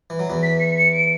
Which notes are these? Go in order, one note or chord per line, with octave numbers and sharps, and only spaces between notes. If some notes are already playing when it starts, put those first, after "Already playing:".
E3
F#3
E2 E3
B6
C#7
C#7
D7